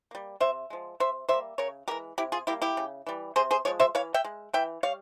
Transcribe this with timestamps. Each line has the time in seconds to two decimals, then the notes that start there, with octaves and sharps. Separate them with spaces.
0.11 G3 A#3
0.40 C3 C5 E5
0.70 F3 G#3
1.00 C3 C5 E5
1.29 G3 A#3 C5 E5
1.58 C#3 A#4 C#5
1.88 E3 G#3 G4 A#4
2.18 C3 E4 G4
2.32 F4 G#4
2.47 G3 A#3 E4 G4
2.62 E4 G4
2.77 C#3
3.07 E3 G3
3.36 C3 G#4 C5
3.51 G#4 C5
3.65 F3 G#3 C#5
3.80 C5 E5
3.95 E3 C#5 F5
4.14 E5 G5
4.24 G#3
4.53 E3 E5 G5
4.83 G3 C#5 F5